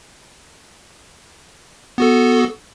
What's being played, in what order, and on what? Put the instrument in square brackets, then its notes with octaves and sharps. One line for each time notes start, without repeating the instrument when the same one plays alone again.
[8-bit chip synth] B3 F#4 A4